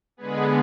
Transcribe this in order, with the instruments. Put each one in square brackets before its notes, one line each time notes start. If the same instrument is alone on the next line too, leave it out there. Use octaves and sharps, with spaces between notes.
[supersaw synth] D3 G#3 B3 G#4 B4